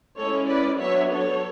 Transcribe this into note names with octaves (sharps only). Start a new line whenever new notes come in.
G#3 C#4 E4 A4 C#5
B4 D5
F#3 B3 D4 C#5 E5
A4 C#5